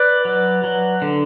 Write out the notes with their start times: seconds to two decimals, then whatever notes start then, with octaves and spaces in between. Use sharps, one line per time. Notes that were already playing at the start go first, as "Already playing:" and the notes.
Already playing: B4 D5
0.25 F#3
0.64 F#3
1.02 D3